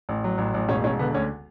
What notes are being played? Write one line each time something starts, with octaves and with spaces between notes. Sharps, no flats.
A1
F#3
A1
A1
E1 C#4
E1 C#4
D3 B3
D2 C#4